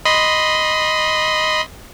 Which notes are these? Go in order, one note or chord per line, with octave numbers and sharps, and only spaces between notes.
D#5 B5 C6